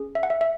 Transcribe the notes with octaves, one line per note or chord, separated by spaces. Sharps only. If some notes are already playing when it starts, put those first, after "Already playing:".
Already playing: C#4 G#4
E5
F#5
E5
E5